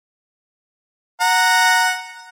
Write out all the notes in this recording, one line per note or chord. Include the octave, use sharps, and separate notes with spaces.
F#5 A#5